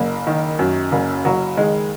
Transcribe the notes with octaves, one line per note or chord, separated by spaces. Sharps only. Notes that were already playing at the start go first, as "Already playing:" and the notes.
Already playing: F#1 A#3
D#3
F#2
F#1
F#1 F#3
D#3 G#3